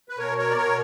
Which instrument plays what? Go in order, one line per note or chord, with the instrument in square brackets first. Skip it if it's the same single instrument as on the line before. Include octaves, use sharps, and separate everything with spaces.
[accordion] B4
B2 A#4 C#5
A#4 C#5
D5
B2 A#4 C#5